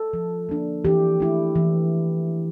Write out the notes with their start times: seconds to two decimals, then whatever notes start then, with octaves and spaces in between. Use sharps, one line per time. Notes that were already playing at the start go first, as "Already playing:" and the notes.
Already playing: A4
0.13 F3
0.49 A#3 D4
0.85 E3 G4
1.20 A3 E4
1.55 E3